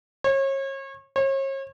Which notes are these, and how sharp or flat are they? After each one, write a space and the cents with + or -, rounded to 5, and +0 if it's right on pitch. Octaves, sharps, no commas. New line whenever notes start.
C#5 -35
C#5 -40